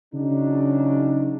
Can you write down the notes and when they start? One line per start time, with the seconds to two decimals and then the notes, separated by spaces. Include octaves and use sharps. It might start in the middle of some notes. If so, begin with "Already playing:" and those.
0.14 C#3 F#3 D4 D#4